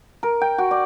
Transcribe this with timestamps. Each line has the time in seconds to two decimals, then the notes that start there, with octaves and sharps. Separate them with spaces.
0.23 A#4
0.41 G5
0.58 F#4
0.71 D5